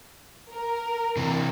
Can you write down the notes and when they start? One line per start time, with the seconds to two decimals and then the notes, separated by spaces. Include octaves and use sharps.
0.53 A#4
1.17 C3 E3